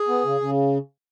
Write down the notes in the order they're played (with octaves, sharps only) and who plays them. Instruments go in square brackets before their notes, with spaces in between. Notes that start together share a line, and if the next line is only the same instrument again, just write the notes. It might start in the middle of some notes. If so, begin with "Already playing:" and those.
Already playing: [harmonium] G#4
B3
C#3
C#3